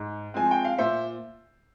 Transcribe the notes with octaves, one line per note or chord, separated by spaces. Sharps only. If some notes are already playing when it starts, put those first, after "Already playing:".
Already playing: G#2
F3 G#3 C4 G#5
G5
F5
A#2 C5 E5